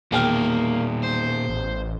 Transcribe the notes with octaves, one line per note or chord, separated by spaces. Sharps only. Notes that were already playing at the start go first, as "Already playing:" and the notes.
E1 A#2 D#3 A#3 G5 F6
C5
A1